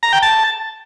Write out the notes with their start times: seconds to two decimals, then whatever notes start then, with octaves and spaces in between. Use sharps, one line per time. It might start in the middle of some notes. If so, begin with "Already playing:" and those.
0.03 A#5
0.13 G5
0.22 A5